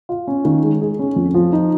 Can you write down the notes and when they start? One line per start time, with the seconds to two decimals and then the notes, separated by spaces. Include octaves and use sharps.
0.09 F4
0.27 C#4
0.45 D#3
0.63 G#3
0.81 G#4
0.99 C#4
1.16 F2
1.34 F3
1.52 D#4